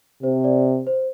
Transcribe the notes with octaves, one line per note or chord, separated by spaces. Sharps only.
C3 C5
D5
C5